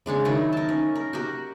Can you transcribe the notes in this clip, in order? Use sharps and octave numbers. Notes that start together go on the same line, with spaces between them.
C#3 G#3 D4 C#5
D#3 F#3 D#4 E4
A#4 A5
C#4
A#4
F#4 G4 A#4